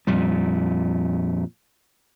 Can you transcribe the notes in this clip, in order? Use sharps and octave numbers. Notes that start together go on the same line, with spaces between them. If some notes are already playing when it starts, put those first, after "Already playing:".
F2 A#2 G3